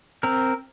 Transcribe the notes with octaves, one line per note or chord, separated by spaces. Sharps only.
C4 A#4